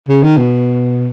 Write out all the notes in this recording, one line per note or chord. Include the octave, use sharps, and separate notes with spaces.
C#3
D#3
B2